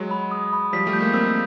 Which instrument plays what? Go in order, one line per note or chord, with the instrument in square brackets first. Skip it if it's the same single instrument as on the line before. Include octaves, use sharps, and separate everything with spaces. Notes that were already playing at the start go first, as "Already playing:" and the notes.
Already playing: [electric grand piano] F#3 G#3
[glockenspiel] B5
D#6
B5
[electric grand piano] F3 G3 [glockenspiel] B6
[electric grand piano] G3 A3
[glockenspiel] G6
[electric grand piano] G#3 A#3
[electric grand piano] A#3 C4 [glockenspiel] E6